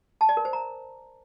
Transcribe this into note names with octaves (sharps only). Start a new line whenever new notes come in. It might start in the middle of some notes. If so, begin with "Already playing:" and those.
A5
D5
A#4
C5
A#5